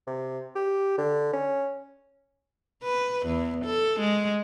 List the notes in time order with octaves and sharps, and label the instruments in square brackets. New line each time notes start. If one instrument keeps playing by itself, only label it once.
[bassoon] C3
G4
D3
C#4
[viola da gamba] B4
E2
A4
G#3